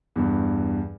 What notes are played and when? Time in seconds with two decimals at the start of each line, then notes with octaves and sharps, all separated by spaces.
0.16 E2 G2